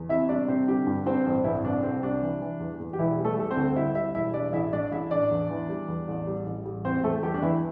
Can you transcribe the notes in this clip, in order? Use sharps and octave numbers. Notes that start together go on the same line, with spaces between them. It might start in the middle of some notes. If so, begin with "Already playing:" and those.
Already playing: E2
C3 E4 E5
G3 D4 D5
C3 C4 C5
D3 G3 G4
G2
G2 C4 C5
A1
C2 E3 E4
C2 D4
C2 C4
G3 D4
E3
E3
E2
E2
G4
E1 E3 E4
G3
A3 A4
G3 A4
C4 C5
D2
G3 E4 E5
G3 E4 E5
E1 E4 E5
G3 D4 D5
A1 E4 E5
A1 D4 D5
A1 E4 E5
A1 D4 D5
E2
E3
G3
E2
A1
G3
A1
G3
E2 C4 C5
E2 A3 A4
E2 G3 G4
D4
E2 E3 E4